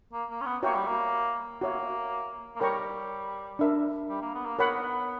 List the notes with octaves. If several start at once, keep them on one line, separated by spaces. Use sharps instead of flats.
A#3
A#3
C#4
B3
A#3 F#4 C#5 E5 G5 C#6
G3
A#3
A#3 F#4 C#5 E5
A#3
G3 A#4 C#5 G5 A#5 C#6
D4 A#4 E5
G3
A#3
B3
A#3
B3 A#4 C#5 F#5 B5